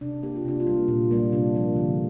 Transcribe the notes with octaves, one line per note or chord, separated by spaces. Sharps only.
C3 D4
A#3 G4
F4
C3 D4
F4
G3 A#3
A#2
G3 A#3
C3 D4
F3 A#3
D3